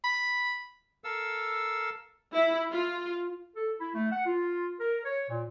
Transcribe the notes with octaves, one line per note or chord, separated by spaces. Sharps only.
B5
A4 A#4 F5 E6
E4
F4
A4
E4
A3
F#5
F4
A#4
C#5
A#2